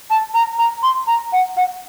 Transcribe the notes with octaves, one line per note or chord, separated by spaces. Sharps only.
A5
A#5
A#5
C6
A#5
F#5
F#5